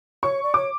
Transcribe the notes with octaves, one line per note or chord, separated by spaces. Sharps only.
C#5 C#6
D5
C#5 D6